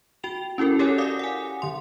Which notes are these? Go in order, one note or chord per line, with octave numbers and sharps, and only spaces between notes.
F#4 G5 F7
C#4 E4 F#4 A4 A#4
G4 A4 A#4 C#5 F#5 G#5
D5 F5 D6 D#6
F#5 G#5
D3 C6